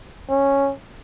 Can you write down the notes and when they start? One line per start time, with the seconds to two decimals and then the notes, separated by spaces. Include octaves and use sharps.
0.29 C#4